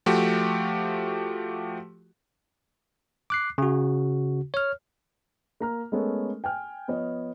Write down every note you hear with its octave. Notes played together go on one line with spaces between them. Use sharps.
F3 A3 F#4 G4
D6 F#6 C7
C#3 F#4
C#5 F6
A#3 A#5 F6
G#3 A3 B3 C#4 A4 A#4
G5 G#5 F6
F3 B3 C#5 D#5